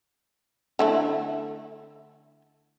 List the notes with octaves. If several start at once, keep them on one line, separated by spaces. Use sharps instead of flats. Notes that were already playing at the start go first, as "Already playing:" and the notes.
D3 A3 E4